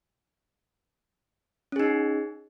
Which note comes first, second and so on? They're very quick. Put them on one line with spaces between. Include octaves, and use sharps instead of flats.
C#4 G#4 D#4